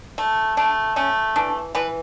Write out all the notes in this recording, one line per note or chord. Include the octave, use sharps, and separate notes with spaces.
A3
A3 D4
A3 C#4
E3 D4
E3 B4